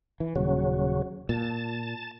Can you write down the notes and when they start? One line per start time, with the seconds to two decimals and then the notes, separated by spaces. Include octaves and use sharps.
0.20 E3
0.36 D#1 C#3 F#3
1.29 A#2 A5